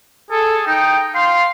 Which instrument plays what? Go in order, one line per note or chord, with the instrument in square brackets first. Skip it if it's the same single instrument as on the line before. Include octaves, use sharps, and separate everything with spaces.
[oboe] G#4 [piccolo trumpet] A4
[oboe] D#4 [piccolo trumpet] G5
[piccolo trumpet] F5 [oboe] C6